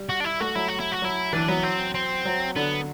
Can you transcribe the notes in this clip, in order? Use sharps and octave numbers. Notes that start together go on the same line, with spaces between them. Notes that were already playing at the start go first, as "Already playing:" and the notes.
Already playing: G3
F#4
D4
E4
A3 F#4
F#3 E4
F#4
E4
F#4
F#3 E4
E3 D4
F#3 B3
C4
C4
F#3
D3 B3